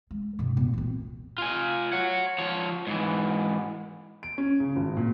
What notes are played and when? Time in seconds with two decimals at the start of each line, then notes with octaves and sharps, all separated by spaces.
0.11 G#3
0.39 G2 C3
0.57 A#2 B3
0.73 E3 C4
1.38 F4 G#5
1.93 C#5 F#5
2.38 F3 C#5
2.87 G#2 E3
4.23 D7
4.38 C#4
4.60 C#3
4.76 G#1
4.97 A#2